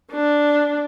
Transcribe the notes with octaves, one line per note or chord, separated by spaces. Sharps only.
D4